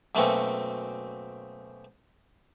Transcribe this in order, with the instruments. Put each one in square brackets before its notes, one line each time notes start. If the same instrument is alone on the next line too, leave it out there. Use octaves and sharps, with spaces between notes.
[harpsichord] F#2 B2 A3 A#3 C4 C#4